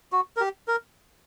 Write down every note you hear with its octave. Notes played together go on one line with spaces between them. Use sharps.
F#4
A#4
G4
A#4